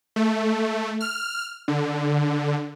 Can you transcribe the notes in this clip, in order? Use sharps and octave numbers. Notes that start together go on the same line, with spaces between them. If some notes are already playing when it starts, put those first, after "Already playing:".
A3
F6
D3